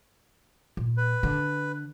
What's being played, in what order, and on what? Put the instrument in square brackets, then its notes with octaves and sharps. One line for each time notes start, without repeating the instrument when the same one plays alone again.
[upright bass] A#2
[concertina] B4
[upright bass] D3